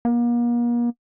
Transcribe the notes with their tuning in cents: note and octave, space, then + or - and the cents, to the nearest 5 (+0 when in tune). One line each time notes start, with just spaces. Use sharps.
A#3 +40